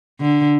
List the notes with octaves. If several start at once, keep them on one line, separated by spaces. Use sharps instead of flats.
D3